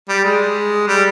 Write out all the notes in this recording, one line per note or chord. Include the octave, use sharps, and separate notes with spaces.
G3
G#3
G3